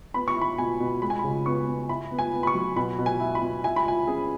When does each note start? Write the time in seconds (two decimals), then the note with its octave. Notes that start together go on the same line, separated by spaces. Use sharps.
0.14 B3 B5
0.28 C#6
0.36 E4
0.41 B5
0.58 B2 G#5
0.80 B2
1.02 G#3 B5
1.10 G#5
1.19 B5
1.24 C#3
1.46 B3 C#6
1.67 B3
1.89 E4 B5
2.11 B3
2.19 G#5
2.33 B3
2.43 B5
2.47 C#6
2.55 F#3
2.76 B2 B5
2.98 B2
3.06 G#5
3.20 E4
3.35 B5
3.42 B2
3.64 E4 G#5
3.76 B5
3.86 E4 G#5
4.07 C#4 G#4